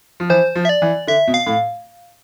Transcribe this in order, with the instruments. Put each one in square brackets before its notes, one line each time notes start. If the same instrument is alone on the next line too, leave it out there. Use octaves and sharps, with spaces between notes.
[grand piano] F3
[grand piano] E3 [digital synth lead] C5
[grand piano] F3
[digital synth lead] E5
D5
[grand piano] E3
[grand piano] D3 [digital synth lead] E5
[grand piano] B2
[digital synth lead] F5
[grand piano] A2